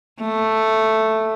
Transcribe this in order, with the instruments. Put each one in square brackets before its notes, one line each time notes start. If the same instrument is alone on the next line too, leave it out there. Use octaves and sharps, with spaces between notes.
[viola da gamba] A3